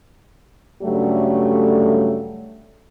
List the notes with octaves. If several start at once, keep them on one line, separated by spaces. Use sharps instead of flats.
G2 C#3 F#3 G3 A3